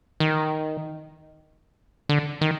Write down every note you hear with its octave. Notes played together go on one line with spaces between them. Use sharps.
D#3
D3
D#3